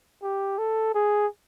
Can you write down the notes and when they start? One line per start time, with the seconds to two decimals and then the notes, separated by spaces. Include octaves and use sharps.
0.23 G4
0.58 A4
0.94 G#4